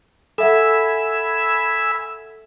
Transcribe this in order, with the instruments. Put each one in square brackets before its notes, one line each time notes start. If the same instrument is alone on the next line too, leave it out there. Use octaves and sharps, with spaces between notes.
[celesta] A4 E5 F#5 [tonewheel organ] G#5 B5 E6